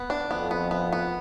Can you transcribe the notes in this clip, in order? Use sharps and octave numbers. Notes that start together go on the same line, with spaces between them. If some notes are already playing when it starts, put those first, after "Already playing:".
Already playing: B3
D4
F2 B3
B3
B3
B3